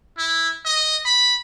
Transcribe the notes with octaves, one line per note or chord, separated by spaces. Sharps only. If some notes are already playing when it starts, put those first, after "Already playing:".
E4
D#5
B5